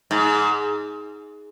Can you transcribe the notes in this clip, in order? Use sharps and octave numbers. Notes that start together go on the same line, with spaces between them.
G#2